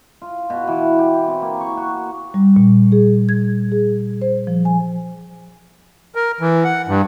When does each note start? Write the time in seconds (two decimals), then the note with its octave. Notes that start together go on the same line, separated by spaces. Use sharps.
0.22 F4
0.50 B2
0.68 E3
0.99 G4
1.28 C4
1.42 A#3
1.61 C#6
1.77 F#4
2.34 G3
2.56 A#2
2.92 G#4
3.29 G#6
3.72 G#4
4.22 C5
4.47 F3
4.65 G#5
6.15 A#4
6.41 E3
6.64 F#5
6.88 G2